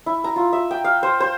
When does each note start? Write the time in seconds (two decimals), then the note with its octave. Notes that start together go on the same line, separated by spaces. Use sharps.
0.06 E4
0.24 A#5
0.36 F4
0.53 E5
0.71 G5
0.84 F5
1.03 C5
1.20 C5